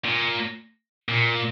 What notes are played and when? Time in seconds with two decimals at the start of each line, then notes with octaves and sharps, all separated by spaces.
0.05 A#2
1.09 A#2